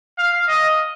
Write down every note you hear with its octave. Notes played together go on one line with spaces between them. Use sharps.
F5
D#5